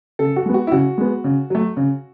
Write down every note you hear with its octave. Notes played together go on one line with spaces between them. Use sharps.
C#3 A4
F#4
G#3 B3
F#4
E4
C#3 F#4
G#3 B3
C#3
F#3 A3
C#3